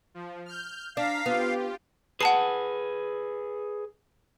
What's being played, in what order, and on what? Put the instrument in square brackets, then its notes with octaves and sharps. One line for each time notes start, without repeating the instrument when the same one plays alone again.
[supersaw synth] F3
F6 G6
[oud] D4 [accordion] F5 [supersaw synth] A#5 B6
[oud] B3 [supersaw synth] F4 G4
[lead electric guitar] G#4 B4 [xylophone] F#5 A5 C7